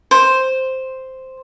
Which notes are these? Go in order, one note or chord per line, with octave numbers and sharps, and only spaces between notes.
C5